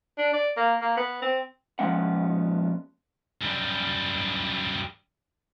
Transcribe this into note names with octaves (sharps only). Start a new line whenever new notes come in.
D4
D5
A#3
A#3
B3
C4
A#2 F3 G#3 B3 C#4 F#5
F#2 G3